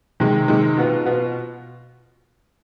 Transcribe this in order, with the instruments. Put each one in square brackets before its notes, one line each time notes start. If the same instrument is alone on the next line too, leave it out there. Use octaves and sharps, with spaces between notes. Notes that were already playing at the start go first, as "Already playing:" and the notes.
[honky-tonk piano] C3 D#3 G#3
C3 D#3 G#3
B2 B3 F4
B2 B3 F4